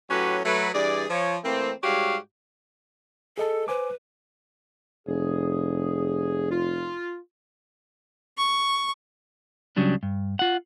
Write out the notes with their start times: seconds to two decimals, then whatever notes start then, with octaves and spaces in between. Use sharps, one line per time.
0.10 A2 F#3 C#4 F#4 G4 B4
0.45 F#3 A3 B4
0.74 G2 E3 G#4 D5
1.09 F3 C#5
1.43 E3 A3 A#3 C4
1.83 G#2 G3 F#4 G4 C#5 F5
3.38 G#4 A4 D#5 A5
3.68 B4 C5 G#5 D6
5.07 F1 G#4
6.50 F4
8.37 C#6
9.76 C#2 C#3 F#3 G3 D4
10.03 G2
10.39 F4 F#5